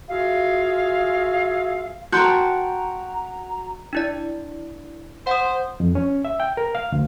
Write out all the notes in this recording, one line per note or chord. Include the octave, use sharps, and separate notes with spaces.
F4 F#4 G#4 E5 F5
F#4 A#4 G5 A5 A#5 C6 F#6 G6
D4 E4 D5
C5 F#5 D#6
F2
C#4
E5
G5
A#4
F5
D2